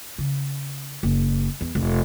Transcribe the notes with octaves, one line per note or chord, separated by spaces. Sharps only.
C#3
F#1
E2
F1